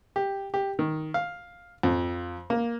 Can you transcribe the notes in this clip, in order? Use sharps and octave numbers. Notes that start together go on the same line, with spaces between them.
G4
G4
D#3
F5
F2
A#3